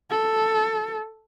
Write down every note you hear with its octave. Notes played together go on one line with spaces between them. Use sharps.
A4